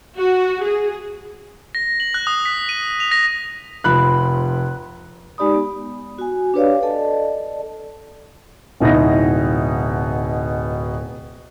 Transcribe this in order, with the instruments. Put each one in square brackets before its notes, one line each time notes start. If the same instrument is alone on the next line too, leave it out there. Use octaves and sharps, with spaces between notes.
[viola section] F#4
G#4
[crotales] A#6
F#7
F#6
D#6
B6
D#7
F7
A#6
[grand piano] F1 F3 B5 F#6
[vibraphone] G#3 D#4 G4 D5 B5 D#6
B3
F#4 G#5
D4 G4 B4 C#5 D5 F5
A4 D5 D#5 A5
[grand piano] D1 B2 D#4 E4 A#6